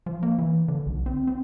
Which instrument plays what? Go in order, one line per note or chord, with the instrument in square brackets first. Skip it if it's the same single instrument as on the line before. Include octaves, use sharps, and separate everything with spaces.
[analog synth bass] F3
A#3
E3
D3
B1
C4
C4